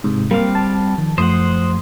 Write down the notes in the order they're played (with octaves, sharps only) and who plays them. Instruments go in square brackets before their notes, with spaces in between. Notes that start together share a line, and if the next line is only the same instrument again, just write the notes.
[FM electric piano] G#2 C3
[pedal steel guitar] G3 C4 F5 [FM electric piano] A#3
[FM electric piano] A5
[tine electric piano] D#3 F3
[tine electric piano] F#2 F3 A3 [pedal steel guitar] C5 F#5 [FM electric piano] C6 D#6